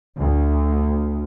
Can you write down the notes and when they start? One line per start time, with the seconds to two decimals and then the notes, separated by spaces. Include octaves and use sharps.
0.18 D2